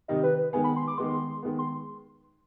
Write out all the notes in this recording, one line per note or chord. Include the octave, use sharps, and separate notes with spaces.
C3 D#3 G3 D#5
B4
B4
D#3 G#3 B3 G#5
B5
C6
D6
D#3 G#3 B3 C6
D#3 G#3 B3
C6